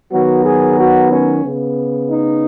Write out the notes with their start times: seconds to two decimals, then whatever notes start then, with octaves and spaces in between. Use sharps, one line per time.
0.11 D#3 F#3 B3 F#4
0.44 G#4
0.78 F#4
1.11 C#4
1.44 C#3 B3
2.09 D#4